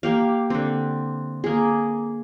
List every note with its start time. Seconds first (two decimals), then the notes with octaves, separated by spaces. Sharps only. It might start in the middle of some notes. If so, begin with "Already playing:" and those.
0.03 A#3 G4 F5
0.50 D3 C4
1.44 A#3 G#4